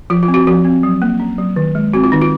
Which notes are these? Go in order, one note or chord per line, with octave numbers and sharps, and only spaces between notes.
F3 F4
F4
C4
F#4
F3 F#4
C4
F#3
A#3
C#4
F#3
D#3
G#3
C4 F#4
F4
D#3 D#4
F4